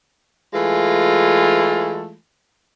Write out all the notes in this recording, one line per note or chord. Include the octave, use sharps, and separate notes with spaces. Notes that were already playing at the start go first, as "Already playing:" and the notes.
E3 G#3 A3 F4